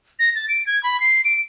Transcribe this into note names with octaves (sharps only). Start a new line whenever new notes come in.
A#6
A6
D7
G#6
B5
C7
D7